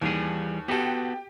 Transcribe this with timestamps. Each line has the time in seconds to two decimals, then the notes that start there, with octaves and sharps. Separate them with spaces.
0.01 D#2 E3 G3 G#4
0.68 B3 F#4 G4 A4 G5